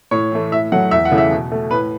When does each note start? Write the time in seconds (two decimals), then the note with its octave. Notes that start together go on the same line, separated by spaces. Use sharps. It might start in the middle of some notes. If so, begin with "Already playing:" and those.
0.11 A2 C#5
0.32 E3 A3
0.52 A2 E5
0.72 F#3 A3 F#5
0.91 E2 E5
1.05 F#5
1.11 C#3 E3 A3
1.18 E5
1.31 B2
1.52 A3
1.71 A2 B4